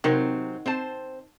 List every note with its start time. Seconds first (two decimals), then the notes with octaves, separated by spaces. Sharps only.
0.04 C3 D#3 F#3 C4
0.66 C4 C5 A5